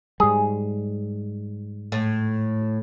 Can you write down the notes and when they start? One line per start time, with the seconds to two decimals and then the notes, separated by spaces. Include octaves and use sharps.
0.20 G#2 G3 G#4
1.92 A2